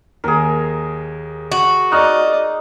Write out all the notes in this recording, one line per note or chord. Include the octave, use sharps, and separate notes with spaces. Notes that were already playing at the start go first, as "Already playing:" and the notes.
D#2 G#4 A#4
F#4
D#4 D5 D#5 C#6 F6 F#6